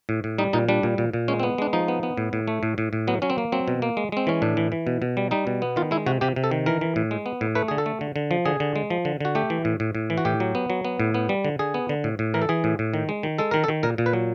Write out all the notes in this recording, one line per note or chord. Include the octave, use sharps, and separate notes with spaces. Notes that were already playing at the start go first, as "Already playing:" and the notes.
A2
A2
G3 D#4
A#2 D#4
G3 D4
A#2
A#2
A#2
G#3 C#4
C4
B3
G#3 D4
F3 D#4
B3
B3
A2
A2
A3
A2
A2
A2
F#3 B3
F#3 C#4
C4
A#3
F#3 C4
B2
A#3
G#3
G#3 C4
E3 C#4
A2 D4
E3
E3
B2
B2
G3
G3 D#4
B2
B3
D#3 F4
G#3 E4
C3 F#4
C3 G4
C3
A4
D#3
E3 A#4
E3
A2
G#3
B3
A2
A3 B4
D3 G#4
A4
A3
D3
D3
F3
D3 G#4
D3
G#3
F3
D3
D3 F#4
A3 G4
E3
A2
A2
A2
E3
F#4
A2 G4
F#3
B3
F#3
B3
A2
B3
G3
D3
D3 G#4
B3
D3
A2
A2
E3 A#4
A4
E3 G#4
A2
A2
D#3
G#3
D#3
G#3 A4
D#3 A#4
A4
D#3
A#2 A#4
A#2
B4
F#3